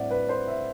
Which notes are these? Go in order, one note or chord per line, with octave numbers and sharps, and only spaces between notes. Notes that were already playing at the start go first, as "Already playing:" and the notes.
Already playing: A2 G3 C4 D5 E5 F#5
B4
C5
E5